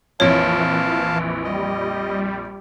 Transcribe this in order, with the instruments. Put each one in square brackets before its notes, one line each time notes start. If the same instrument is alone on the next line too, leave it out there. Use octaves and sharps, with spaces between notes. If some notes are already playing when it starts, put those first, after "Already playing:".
[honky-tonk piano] A#1 F2 [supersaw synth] E3 [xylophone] C#5 [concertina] F5 A5
[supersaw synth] G3 [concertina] D#5